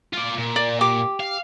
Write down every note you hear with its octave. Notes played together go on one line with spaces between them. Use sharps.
F4 D5
A#2
D5
G4 D6
F5